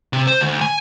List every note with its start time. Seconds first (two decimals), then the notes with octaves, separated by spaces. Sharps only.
0.13 C3
0.27 C5
0.41 D2
0.61 G#5